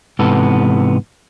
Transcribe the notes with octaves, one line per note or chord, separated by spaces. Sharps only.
G#2 C3 E3 B3 A4